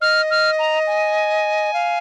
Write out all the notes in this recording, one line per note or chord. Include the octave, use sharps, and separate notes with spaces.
D#5 F6
F6
A#5
G#5
F5